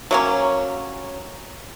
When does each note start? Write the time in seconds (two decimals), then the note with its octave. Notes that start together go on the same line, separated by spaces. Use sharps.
0.11 F#3 A#3 C#4